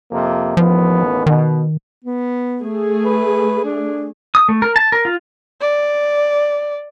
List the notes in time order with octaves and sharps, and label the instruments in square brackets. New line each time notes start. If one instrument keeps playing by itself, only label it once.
[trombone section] F2 C3 A#3
[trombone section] A1 D#2 B3 [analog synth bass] F3
[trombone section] B2 [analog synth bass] D#3
[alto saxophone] B3
[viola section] A3 G#4
[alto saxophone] B4
D4
[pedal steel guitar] D#6
A3
A#4
A5
A#4
F4
[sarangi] D5